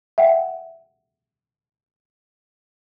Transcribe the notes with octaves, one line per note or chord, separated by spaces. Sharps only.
E5 F#5 G5